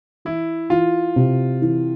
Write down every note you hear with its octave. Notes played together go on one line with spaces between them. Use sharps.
E3 E4
E3 F4
C3
E3